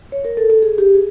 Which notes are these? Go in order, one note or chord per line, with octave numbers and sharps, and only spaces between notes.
C#5
A#4
A4
A4
G#4
G4
G#4